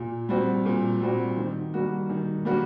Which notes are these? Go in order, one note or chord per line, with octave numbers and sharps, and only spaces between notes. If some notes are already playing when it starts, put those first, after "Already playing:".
Already playing: A#2
G3 C4 F#4
A#2
G3 C4 F#4
D#3
G3 A#3 F#4
D#3
G3 A#3 F#4